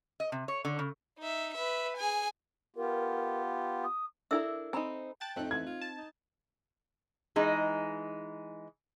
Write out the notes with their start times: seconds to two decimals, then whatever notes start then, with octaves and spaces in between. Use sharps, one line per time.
0.20 D#5
0.32 C3
0.48 C#5
0.65 D3
0.79 C#3
1.19 D#4 E5
1.55 B4 E5
1.97 G#4 G#5
2.76 B3 F4 G4 A#4
3.84 D#6
4.31 D4 E4 A4 A#4 E5 E6
4.73 C4 D#4 G#5 A#5 B5
5.21 G5 A5 F#6 A6
5.36 F2 A3 C4 D#4 F#6
5.51 E3 G#6
5.66 F4
5.81 A5
5.98 D#4
7.36 E3 G#3 D#4